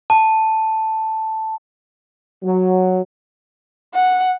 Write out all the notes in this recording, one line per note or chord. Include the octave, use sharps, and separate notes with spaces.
A5
F#3
F#5